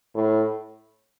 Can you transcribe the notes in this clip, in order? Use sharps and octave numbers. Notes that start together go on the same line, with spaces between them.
A2